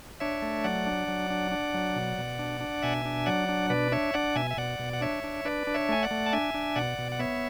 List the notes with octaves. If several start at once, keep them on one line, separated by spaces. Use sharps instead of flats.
D4 C#5 E5
A3
F#3 D5 F#5
D4
F#3
D4
D4
F#3
B2
B2
D4
D4
B2 E5 G#5
D4
F#3 D5 F#5
D4
B2 B4 D5
D4 C#5 E5
D4 D5 F#5
B2 E5 G#5
E5
B2 D5 F#5
B2
F#5
D4 C#5 E5
D4
D4 B4 D5
D4
C#5 E5
A3 G#5
D5 F#5
A3
A5
D4 E5 G#5
D4
B2 D5 F#5
B2
F#5
B3 C#5 E5